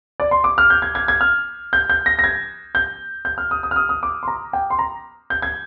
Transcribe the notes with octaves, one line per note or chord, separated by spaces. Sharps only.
D5
C6
D6
F6
G6
G#6
G#6
G#6
F6
G6
G6
A#6
A#6
G#6
G6
G6
F6
D#6
D#6
F6
D#6
D#6
D6
C6
A#5
G5
C6
A#5
G6
G#6